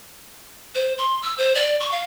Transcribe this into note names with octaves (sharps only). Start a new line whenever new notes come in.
C5
C6
E6
C5
D5
C#6
F5